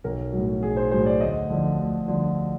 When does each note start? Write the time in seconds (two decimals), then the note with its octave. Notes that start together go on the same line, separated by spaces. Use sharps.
0.04 B1 A#4
0.33 A2 F#3
0.63 B1 G#4
0.77 C5
0.91 A2 F#3 C5
1.06 D5
1.21 D2 D#5
1.50 D3 F3
1.80 D2
2.08 D3 F3